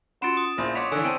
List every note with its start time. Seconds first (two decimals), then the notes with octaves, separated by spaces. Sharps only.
0.22 C#4 F4 F#4 F#5 C6 A6 D7 E7
0.37 D#6
0.58 A#1 E4 G#4 C5
0.75 C#5 D#5 F#5 C6 D6 B6 F7
0.92 D3 E3 G#5 E6
1.04 C4 D5 G#5 A5 D7 D#7